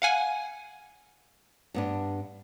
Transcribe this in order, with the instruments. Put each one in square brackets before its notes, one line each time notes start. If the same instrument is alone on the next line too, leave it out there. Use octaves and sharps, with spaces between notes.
[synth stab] F5 F#5 G#5
[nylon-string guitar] G2 B3 D4